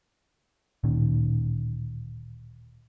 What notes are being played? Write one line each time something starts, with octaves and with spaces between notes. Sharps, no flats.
D1 A#2 D#3 C#4